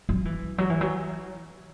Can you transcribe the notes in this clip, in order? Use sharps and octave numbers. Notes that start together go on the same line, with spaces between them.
F#3
E3
F#3
E3
F#3